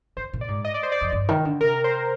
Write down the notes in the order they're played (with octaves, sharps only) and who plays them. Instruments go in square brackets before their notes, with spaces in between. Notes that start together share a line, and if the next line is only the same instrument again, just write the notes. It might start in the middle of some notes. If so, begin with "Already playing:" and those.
[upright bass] D3 [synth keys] C5
[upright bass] A#2
[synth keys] D5
[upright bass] G#2
[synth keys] D#5
D5
C5
D5
[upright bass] F2
G2
D#3
D3
[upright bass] C3 [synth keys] A#4
[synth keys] C5